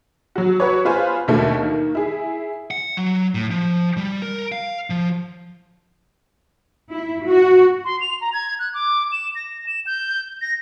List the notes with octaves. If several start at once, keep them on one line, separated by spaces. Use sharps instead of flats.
F#3 F#4
F#4 B4 C#5
B3 F4 B4 C5 G#5
D#2 B2 D3 A3 A#3
D#3 A#3
E4 G#4
F#5
F#3
A2
F3
G3
A#4
F5
F3
E4
F#4
C6
F7
A#5
G#6
F#6
D6
E7
A#6
E7
G6
A#6